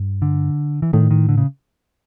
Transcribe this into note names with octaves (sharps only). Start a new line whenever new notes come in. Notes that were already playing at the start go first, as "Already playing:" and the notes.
Already playing: G2
D3
E3
A2 D#3
D#3
D3
C#3